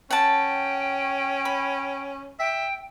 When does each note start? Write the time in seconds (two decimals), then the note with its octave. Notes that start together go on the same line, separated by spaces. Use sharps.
0.10 C#4 F#5 G5 A5
1.45 B5
2.39 E5 G5